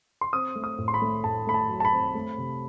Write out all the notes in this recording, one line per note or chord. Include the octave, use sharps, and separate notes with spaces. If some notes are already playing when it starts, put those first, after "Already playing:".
C6
C4 D#6
A3
D#6
A2
C6
B5
A3
A2 A5
A3 B5
A5
F#3
A5
B5
C4
A3
C3